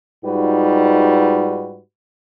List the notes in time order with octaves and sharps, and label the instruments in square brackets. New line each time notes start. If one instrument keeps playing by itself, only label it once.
[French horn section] G#2 G3 D#4 F4 F#4 B4